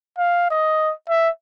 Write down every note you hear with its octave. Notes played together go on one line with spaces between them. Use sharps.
F5
D#5
E5